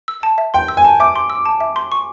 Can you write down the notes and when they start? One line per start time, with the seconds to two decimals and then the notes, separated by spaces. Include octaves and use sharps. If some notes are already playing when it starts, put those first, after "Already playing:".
0.08 E6
0.23 A5
0.38 E5
0.54 G5 C6
0.68 E6
0.77 G#5
0.84 A5
1.00 E5 D6
1.16 C6
1.30 E6
1.45 A5
1.61 E5
1.76 C6
1.92 C#6